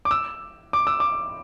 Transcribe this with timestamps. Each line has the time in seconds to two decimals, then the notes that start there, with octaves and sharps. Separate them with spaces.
0.05 D6
0.11 E6
0.73 D6
0.87 E6
1.00 D6